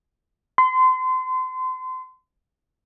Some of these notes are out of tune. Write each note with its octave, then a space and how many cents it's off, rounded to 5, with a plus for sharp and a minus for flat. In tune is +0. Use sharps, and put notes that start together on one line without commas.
C6 -30